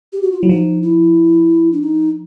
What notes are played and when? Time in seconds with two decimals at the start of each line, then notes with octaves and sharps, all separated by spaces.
0.13 G4
0.23 F#4
0.32 F4
0.41 F#3 E4
0.49 F3 D#4
0.82 E4
1.73 D4
1.82 D#4